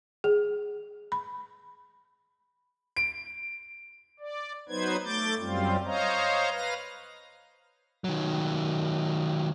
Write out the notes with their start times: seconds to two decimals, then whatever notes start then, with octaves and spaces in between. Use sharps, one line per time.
0.24 G#4
1.12 B5
2.97 D7
4.20 D5
4.69 F#3 B3 D#4 B4 C5 G#6
5.05 A3 D6 G6 A6
5.39 F#2 G3 C4 F4
5.86 C5 C#5 D#5 F5 A#5
6.51 B4 F5 A#6
8.04 D#3 F#3